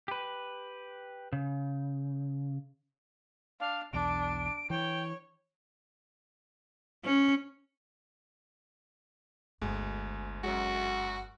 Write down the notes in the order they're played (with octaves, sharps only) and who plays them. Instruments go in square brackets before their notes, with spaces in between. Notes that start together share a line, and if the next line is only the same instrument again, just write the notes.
[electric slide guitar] G4 B4
C#3
[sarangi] D4 [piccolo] F5
[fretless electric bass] B1 E2 [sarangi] D4 [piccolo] D7
[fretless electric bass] E3 [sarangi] C#5 [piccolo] G5
[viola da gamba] C#4
[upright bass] G1 [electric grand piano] D2 G#3
[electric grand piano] F#2 F#3 G#3 [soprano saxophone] F#4